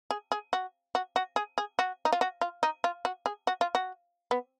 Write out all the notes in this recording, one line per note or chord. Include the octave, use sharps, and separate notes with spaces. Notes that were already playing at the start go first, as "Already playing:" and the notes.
G#4
G#4
F#4
F#4
F#4
G#4
G#4
F#4
D#4
F4
F#4
F4
D#4
F4
F#4
G#4
F#4
F4
F#4
B3